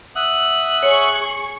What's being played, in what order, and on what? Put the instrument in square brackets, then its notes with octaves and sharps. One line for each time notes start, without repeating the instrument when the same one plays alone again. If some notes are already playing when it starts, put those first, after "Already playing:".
[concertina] E5 F#5 D#6 [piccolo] F#7
[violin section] G#4 C#6 [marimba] C#5